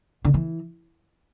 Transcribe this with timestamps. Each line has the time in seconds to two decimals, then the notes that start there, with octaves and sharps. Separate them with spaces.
0.24 D3
0.34 E3